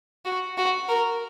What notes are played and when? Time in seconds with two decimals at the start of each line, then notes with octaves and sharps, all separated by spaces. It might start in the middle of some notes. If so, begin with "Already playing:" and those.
0.25 F#4
0.58 F#4
0.89 A#4